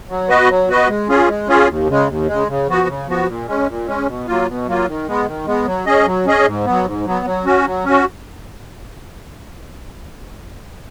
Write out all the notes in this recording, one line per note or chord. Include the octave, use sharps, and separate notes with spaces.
F#3
B3 F#4 B4 D#5
F#3
B3 F#4 B4 D#5
G#3
C#4 F4 G#4
G#3
C#4 F4 G#4
D#2
C#3 G#3
D#2
C#3 G#3
C#3
F3 B3 F#4
C#3
F3 B3 F#4
A#2
G#3 C#4
A#2
G#3 C#4
B2
F#3 A#3 F4
B2
F#3 A#3 F4
D#3
G#3 B3
D#3
G#3 B3
F#3
C#4 G#4 D#5
F#3
C#4 G#4 D#5
G#2
F#3 B3
G#2
F#3 B3
F#3
C#4 F#4
F#3
C#4
F#4